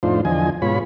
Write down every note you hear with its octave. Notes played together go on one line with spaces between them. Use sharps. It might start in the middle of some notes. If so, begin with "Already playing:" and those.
F2 A2 D4 D#4 F4 C5
E2 D3 F3 D#5 G#5
G#2 B2 F4 C#5 B5